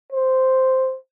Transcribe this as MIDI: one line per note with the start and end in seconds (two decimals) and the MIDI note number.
0.12 0.96 72